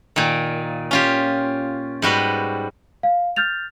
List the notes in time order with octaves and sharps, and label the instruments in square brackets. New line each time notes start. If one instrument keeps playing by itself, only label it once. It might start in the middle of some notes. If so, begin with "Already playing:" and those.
[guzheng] A#2 D#3
C#4 F4 G4
G#2 G3 F#4 B4
[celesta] F5
F6 G6 A6 F7